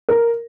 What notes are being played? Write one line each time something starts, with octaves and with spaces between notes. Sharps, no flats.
A#4